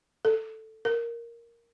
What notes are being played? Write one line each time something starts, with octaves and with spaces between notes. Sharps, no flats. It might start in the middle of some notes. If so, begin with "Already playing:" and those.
A4
A#4